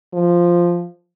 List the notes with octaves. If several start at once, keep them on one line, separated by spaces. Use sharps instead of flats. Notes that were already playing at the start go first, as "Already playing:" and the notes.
F3